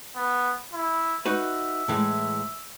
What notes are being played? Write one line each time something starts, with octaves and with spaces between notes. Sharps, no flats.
B3
E4
D#4 F#4 B4 E5
A2 E3 G#3